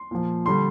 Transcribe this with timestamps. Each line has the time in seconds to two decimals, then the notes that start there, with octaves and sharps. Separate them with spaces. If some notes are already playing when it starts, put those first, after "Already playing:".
Already playing: C6
0.11 A#2 F3
0.46 D3 G3 C6